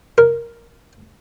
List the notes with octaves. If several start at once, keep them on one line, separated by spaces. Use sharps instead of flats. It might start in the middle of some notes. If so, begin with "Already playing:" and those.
A#4